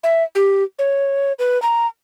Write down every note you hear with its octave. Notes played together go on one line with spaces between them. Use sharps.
E5
G4
C#5
B4
A#5